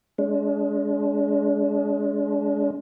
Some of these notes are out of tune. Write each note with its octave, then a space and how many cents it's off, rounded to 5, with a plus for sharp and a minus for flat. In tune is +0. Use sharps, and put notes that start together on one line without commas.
G#3 +5 D4 -40